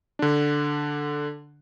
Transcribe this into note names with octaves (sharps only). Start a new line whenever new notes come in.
D3 D4